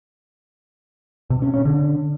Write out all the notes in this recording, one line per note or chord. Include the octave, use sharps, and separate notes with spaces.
B2
C#4
C#4
D3